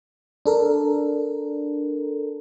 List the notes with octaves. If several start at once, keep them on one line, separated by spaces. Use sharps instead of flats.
D4 A4 A#4